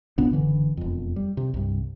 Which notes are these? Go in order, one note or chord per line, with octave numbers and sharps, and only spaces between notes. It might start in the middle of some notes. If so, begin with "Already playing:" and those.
C2 A#2 B3 D4
F#1 D3 E3
E1 F2
G3
C3
C2 G2